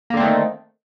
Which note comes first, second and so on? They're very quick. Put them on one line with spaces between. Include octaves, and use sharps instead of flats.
A#3 D3 C4 A3 D#3